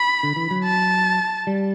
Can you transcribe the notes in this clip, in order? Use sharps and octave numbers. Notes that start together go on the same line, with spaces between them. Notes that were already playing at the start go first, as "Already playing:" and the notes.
Already playing: B5
D3
E3
F#3
A5
G3